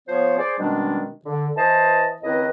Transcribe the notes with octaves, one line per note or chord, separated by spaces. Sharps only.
F3 B3 C5 C#5
G#4 C5 D5
B2 D#3 G3 G#3 C#4 D4
D3
E3 C5 D#5 A5
C#2 D#3 C4 E4 B4 D#5